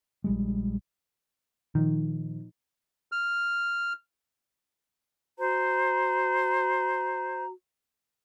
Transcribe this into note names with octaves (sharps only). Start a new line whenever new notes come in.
A#1 G3 G#3
A#2 D#3 F3 D#4
F6
F#4 C5 A#5